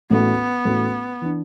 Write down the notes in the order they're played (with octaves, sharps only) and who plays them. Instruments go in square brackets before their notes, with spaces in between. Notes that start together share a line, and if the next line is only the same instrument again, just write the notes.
[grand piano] A1 A2 A3 F#4 A4 [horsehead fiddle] B3
[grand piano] A1 A2 A3 F#4 A4
E3 D4